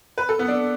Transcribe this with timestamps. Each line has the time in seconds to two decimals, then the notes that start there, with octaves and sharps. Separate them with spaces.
0.18 B4
0.29 A4
0.39 B3
0.48 D4